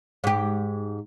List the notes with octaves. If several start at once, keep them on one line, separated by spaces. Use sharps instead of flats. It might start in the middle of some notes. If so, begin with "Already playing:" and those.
G#2 G4